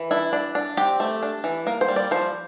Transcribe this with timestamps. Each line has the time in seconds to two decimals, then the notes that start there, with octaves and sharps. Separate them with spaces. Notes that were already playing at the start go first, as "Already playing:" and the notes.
Already playing: E3
0.11 D4 E4
0.33 D4
0.55 D4
0.77 C4 G4
1.00 A3
1.23 D4
1.44 E3
1.67 A#3 A#4
1.81 C5
1.88 G3
1.96 D5
2.11 F3 C5